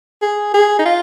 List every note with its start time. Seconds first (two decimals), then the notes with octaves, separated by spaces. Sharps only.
0.22 G#4
0.54 G#4
0.79 D#4
0.85 F4